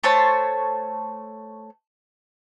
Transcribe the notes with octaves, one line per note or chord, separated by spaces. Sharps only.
A3 C5 C#5 A5